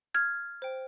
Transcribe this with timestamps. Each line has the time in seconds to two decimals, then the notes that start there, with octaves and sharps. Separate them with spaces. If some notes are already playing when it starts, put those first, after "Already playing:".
0.15 F6 G#6
0.62 C5 G5